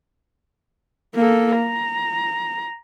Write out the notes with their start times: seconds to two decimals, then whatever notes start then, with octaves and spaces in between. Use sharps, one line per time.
1.15 A#3 A4
1.58 A#5